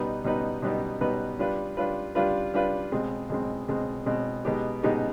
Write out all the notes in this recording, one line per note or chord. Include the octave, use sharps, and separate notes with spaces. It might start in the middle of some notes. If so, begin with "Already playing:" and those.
Already playing: B2 G3 B3 D#4 B4
B2 G3 B3 D#4 B4
B2 G3 B3 D#4 B4
B2 G3 B3 D#4 B4
G3 D4 F4 B4
G3 D4 F4 B4
G3 D4 F4 B4
G3 D4 F4 B4
B2 G#3 C4
B2 G#3 C4
B2 G#3 C4
B2 G#3 C4
B2 G#3 B3 D#4 G4
B2 G#3 B3 D#4 G4